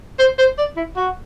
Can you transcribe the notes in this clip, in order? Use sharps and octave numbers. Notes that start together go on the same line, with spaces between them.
C5
C5
D5
E4
F#4